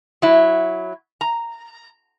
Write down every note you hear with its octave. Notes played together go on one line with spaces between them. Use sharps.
F#3 E4
A#5